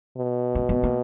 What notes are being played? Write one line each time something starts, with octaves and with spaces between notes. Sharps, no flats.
B2
C#4
B3
A#3